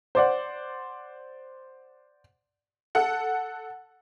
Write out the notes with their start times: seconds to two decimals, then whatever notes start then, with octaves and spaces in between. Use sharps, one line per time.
0.15 C5 D5 F#5
2.95 A4 F#5